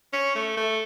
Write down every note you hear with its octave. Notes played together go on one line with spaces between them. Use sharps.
C#4
A3
A3